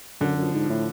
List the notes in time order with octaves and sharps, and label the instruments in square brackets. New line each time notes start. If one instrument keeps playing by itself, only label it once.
[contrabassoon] F#2 [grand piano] D3
[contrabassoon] F#2
[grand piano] F3
[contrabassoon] G#2
[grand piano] F3
[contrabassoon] A2